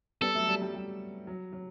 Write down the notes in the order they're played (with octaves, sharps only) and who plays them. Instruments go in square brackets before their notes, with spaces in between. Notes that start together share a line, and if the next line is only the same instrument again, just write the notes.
[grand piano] G3 B3 [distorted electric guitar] A4
[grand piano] F#3 A3
G3
G3
G3
F#3
F#3